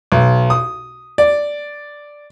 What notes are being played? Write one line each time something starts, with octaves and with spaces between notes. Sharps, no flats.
B1
D#6
D5